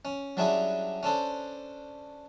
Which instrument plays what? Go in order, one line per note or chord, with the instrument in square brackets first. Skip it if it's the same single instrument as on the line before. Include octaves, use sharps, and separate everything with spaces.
[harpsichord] C#4
F#3 G3 C#4 D4 E4 G#4
C#4 D4 A4 C5